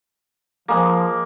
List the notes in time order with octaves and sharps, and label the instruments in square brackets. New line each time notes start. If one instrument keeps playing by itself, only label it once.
[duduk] F3 [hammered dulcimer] G#3 A#3